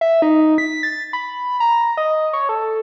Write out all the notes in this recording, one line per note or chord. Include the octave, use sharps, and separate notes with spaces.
E5
D#4
B6
A6
B5
A#5
D#5
C#5
A4